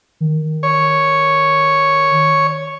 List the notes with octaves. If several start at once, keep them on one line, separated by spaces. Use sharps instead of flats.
D#3
C#5